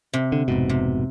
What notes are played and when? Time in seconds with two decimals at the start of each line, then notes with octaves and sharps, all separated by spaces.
0.14 C3
0.32 D3
0.48 F1 G#2 B2
0.69 C3